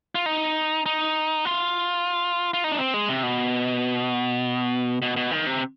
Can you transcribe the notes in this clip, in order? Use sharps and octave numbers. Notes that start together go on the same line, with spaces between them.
F4
D#4
D#4
F4
F4
D#4
D4
C4
G#3
C3
B2
B2
B2
D#3
C3